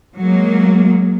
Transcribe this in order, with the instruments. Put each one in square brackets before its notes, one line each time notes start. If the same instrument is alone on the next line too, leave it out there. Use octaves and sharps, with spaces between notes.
[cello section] F#3 G#3 A#3